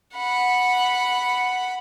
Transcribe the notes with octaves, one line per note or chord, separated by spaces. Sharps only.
F#5 B5